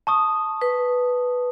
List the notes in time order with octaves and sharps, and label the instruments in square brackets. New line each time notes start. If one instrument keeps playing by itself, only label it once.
[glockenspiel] A5 C#6 D#6
[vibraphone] B4